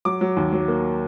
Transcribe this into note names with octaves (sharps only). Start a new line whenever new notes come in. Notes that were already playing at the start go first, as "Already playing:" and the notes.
F#3 D6
F#3
D#2
F#3
A#3